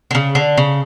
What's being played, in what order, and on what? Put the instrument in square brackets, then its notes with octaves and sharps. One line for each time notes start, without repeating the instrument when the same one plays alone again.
[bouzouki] D3
C#3
D3
C#3